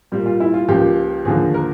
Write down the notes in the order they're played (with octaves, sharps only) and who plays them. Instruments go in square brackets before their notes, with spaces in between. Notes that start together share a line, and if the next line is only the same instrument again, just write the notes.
[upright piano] A#2 G3 A#3
F4
E4
F4
C#2 C#3 F3 A#3 G4
D#2 D3 F3 A#3 G#4
A#4